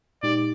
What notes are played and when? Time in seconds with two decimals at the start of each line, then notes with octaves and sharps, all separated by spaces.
0.23 A#2 G#3 D#4 G4 D5